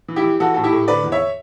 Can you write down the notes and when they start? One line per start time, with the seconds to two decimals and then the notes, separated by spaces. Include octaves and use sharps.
0.08 E3
0.16 E4 G4
0.24 E3
0.40 E3 F#4 A4
0.54 A2 A4
0.64 E4 G4
0.73 A2
0.87 D3 B4 D5
1.04 E2
1.12 C#5 E5